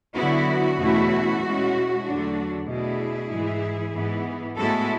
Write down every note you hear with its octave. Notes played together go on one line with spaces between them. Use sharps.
D3 F#3 B3 E4 F#4
E2 B2 A3 C#4 E4
B2 G#3 C#4 E4
E2 D3 F#3 A3 D4
B2 A3 D4 E4 G#4
G#2 E3 G#3
G#2 E3 B3
A2 G#3 B3 E4 F#4 A4